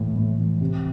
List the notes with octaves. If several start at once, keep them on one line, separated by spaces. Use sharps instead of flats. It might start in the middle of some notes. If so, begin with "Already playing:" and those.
Already playing: A2 E3
A2
E3
C3